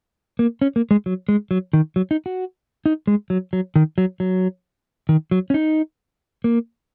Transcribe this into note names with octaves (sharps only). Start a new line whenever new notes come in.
A#3
C#4
A#3
G#3
F#3
G#3
F#3
D#3
F#3
D#4
F#4
D#4
G#3
F#3
F#3
D#3
F#3
F#3
D#3
F#3
C#4
D#4
A#3